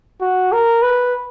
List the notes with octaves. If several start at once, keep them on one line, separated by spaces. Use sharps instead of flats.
F#4
A#4
B4